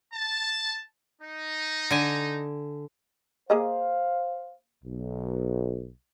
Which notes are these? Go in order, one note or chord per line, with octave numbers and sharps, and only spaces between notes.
A5
D#4
D3 G#5
A#3 G#4 C5 D#5 F5
B1